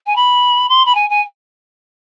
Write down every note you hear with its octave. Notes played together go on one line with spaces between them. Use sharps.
G#5
B5
C6
B5
G#5
G#5